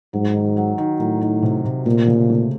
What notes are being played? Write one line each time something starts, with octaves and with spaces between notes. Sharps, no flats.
G#2 F#3
D#3
F#3
D#3
A2 F#3
D#3
C3
C3
A#2 A3
C#3
A3